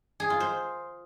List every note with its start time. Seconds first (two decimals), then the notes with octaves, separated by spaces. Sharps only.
0.20 G#4
0.30 F4
0.40 C5